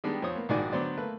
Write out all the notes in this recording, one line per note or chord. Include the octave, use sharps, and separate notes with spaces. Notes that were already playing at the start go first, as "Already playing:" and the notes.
D#3 G3 G#3 B3 D4
F2 C5 C#5 D#6
A#3 B3
A#1 G#2 D#3 F#4 D5 G#5
D3 F#3 B3 C5 D5
A3 A#3 B4